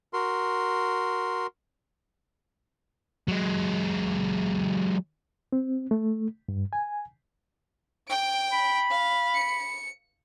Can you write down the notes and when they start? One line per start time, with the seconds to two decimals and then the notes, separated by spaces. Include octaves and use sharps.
0.13 F#4 A#4 C6
3.28 F#3 G#3
5.53 C4
5.91 A3
6.49 G2
6.73 G#5
8.08 G5 D7
8.53 B5
8.90 F5
9.34 C#7